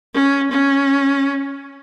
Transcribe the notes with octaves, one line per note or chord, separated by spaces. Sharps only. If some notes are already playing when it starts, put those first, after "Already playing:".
C#4
C#4